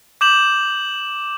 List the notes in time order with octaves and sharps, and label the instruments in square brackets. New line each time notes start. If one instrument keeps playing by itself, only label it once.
[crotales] D6 G6 E7 F#7